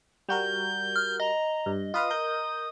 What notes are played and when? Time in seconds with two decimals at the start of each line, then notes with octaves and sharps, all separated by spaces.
0.29 G3 F#4 A#4 G6
0.96 F6
1.20 D#5 A#5
1.66 G2
1.94 F4 B4 F5 D#6
2.10 A#4 G6